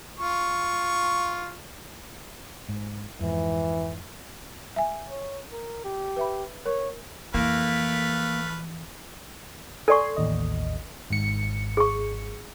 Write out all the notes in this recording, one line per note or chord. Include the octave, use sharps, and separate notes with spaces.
F4 C#6
G#2
F2 G#2 E3
E5 G#5
C#5
A#4
G4
B4 E5 B5
A#4 C#5
F2 E3 A3 A#3 B4 F6
A4 D5 G#5 C6 C#6
A1 D#2 D#5
G#1 G#2 C#7
G#4 C#6